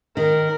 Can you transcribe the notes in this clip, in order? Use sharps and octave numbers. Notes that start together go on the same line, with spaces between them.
D#3 A#4